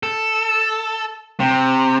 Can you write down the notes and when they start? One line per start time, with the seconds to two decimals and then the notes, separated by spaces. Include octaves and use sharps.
0.03 A4
1.40 C3